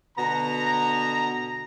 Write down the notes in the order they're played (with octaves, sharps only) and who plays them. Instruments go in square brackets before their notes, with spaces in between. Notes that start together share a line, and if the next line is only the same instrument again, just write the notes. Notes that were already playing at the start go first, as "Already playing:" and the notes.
[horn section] B2 D3 B3 A#5